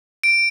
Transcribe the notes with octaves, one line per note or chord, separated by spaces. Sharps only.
D7